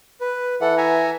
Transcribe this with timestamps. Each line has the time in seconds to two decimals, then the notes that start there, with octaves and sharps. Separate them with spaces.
0.21 B4
0.61 E3 A4 F#5
0.77 E5 G#5 A#5